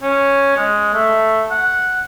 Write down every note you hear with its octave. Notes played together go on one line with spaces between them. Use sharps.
C#4
G#3
A3
F#5